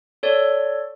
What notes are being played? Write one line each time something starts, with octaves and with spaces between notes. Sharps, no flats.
A4 C#5 D5